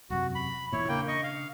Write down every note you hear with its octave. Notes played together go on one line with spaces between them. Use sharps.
E1 F#2 C3 F#4
B5
E1 E2 A#2 E4 C#5
C#3 A#3 D4 G5
D#5 C#6
F5